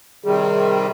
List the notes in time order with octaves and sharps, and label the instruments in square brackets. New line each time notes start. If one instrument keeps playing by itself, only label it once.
[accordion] C3 D#3 G3 [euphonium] G#4